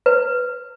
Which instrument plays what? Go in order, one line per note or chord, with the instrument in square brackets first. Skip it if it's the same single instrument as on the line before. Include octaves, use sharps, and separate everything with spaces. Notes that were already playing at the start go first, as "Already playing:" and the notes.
[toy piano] B4